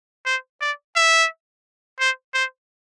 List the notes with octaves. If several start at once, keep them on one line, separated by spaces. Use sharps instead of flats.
C5
D5
E5
C5
C5